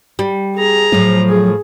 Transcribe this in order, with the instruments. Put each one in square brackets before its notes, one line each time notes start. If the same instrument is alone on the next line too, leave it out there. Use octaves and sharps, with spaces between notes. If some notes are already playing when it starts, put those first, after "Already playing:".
[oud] G3
[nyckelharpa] G#4 A#5
[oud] A2 F3 [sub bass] F#3
[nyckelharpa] G#4